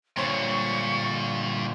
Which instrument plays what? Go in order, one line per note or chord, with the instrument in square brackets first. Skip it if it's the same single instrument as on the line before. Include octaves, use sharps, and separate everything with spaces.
[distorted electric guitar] G2 [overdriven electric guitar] A#2 D3 [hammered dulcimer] C5 C#5 [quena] C#6